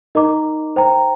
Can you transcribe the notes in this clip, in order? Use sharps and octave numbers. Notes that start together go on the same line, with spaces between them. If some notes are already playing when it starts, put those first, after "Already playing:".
D#4 A#4 D#5 A#5 D6
C5 G5 A#5